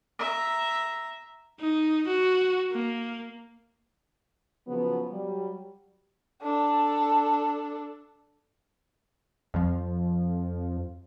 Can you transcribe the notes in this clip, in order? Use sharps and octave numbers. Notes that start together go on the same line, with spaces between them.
E5 A#5
D#4
F#4
A#3
C#3 F3 F#3 B3
F#3 G3
D4 A4
F2 F3